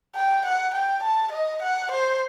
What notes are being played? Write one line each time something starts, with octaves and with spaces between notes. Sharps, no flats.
G5
F#5
G5
A5
D#5
F#5
C5